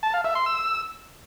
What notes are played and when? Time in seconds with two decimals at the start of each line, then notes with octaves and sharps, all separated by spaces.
0.03 A5
0.14 F5
0.24 E5
0.35 C6
0.46 E6